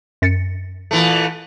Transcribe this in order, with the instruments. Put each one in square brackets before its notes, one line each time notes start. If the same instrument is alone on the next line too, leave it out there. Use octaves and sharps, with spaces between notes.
[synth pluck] F#2 A6 C#7
[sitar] A#2 E3 A3